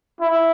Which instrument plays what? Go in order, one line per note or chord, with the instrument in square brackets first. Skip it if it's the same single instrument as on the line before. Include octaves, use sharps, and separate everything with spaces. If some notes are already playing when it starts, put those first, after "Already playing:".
[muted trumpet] E4